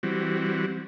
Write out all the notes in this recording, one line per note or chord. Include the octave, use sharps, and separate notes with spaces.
E3 G3 C4 F#4